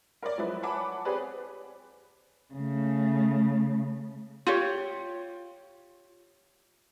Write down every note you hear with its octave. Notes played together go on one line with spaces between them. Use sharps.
A#4 C#5 D5
F3 F#3 G#3 E4 B4
C#5 F#5 G#5 A5 B5 D6
C4 G4 G#4 B4 C#5 D5
C#3 A3
F4 G4 C#5